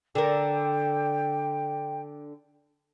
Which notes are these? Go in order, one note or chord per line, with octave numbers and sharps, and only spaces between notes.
D3 A#4 G5